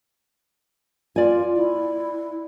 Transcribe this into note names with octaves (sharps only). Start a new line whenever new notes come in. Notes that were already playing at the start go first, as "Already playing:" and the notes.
F4 D5 G#5
E4